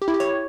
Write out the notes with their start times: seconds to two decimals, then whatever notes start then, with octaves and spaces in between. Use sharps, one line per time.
0.02 G4
0.08 E4
0.14 G4
0.20 C#5